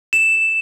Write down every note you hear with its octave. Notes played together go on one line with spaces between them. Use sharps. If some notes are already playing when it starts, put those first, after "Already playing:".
E7